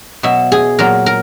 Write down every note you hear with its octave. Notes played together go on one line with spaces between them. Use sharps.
B2 F#3 E5
G#4
A#2 F#3 A#4
A#4